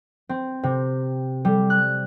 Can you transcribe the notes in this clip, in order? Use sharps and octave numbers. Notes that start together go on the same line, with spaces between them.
C4
C3
G3
F#6